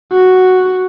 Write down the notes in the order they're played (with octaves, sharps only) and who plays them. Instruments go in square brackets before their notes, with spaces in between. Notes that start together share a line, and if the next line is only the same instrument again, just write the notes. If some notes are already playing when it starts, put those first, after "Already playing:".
[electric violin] F#4